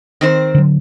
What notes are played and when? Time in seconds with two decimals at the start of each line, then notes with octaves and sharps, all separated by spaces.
0.21 D#3 C4 C5
0.54 D3 F#3